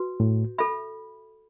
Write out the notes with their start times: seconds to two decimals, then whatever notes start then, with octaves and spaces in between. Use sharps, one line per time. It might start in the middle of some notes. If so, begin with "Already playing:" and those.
Already playing: F#4 B4
0.20 A2
0.58 A4 E5 B5